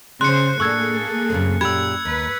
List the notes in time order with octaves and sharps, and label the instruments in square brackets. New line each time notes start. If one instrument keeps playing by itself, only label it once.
[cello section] C#3 C5 [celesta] C6 [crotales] F#6 C#7
[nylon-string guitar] A2 D4 [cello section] A#3 G#4 A4 [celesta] C#6 E6 G#6
[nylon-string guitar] F#2 C#3 C4
[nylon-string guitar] F#2 A#2 G4 [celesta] B5 [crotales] E6 G#6
[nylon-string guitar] D#2 [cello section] B4